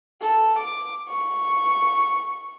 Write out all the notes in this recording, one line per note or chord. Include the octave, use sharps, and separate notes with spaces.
A4
D6
C#6